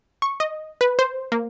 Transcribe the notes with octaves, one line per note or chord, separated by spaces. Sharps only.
C#6
D#5
B4
C5
A#3